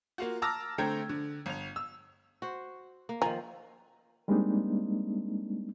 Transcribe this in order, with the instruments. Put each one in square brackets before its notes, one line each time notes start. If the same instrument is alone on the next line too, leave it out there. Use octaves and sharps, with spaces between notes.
[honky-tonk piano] A#3 F4 F#4
A5 A#5 D6 E6 F6 A#6
D3 A3 C4 G5 A#5 G#6
D3
G1 F7
E6
[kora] F#4 C5
A#3
[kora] D#3 F3 [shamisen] G#5 A#5
[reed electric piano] G3 G#3 A#3 C4 D4 D#4